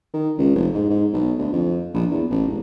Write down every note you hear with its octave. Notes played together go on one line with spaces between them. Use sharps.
D#3
C#2
F1
G#2
G#2
B1
D2
F2
A#1
E2
A1
E1